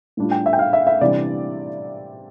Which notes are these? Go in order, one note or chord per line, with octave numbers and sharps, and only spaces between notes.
A2 G3 D4 F4
G5
E5
G5
F5
E5
E5
C3 E3 G3 D4 D5